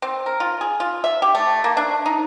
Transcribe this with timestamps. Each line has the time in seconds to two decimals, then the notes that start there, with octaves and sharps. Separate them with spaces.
0.02 C4
0.26 A#4
0.40 F4
0.61 G#4
0.80 F4
1.04 E5
1.22 G4
1.35 A3
1.64 A#3
1.77 D4
2.06 D#4